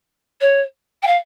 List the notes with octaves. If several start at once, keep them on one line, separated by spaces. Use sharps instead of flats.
C#5
G5
F5